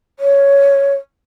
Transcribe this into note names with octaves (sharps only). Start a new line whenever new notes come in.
C#5